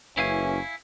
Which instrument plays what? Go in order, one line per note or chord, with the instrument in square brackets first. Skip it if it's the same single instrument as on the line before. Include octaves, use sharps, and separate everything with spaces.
[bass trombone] F#1 [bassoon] E3 [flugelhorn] C#4 [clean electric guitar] E4 F5 G#5